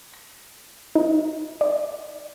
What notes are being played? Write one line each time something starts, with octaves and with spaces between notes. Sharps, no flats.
A#6
D#4
D5